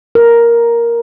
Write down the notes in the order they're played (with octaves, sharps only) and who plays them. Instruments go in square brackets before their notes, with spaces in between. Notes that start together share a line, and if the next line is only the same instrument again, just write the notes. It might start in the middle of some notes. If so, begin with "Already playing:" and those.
[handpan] A#4